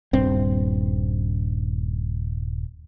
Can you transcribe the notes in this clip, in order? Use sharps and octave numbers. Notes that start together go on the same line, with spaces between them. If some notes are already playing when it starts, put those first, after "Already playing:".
D#1 G2 C4